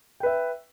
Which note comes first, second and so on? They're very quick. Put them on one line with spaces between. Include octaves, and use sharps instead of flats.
G5 B4 E5